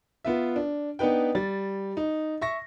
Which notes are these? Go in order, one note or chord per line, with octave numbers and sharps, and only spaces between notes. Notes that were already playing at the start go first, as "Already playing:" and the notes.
B3 F4 E5
D4
B3 D4 D#4 B4 G5
G3 A6
D#4
E5 C#6 A#6